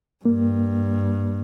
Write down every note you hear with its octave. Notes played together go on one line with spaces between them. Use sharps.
G2 A#3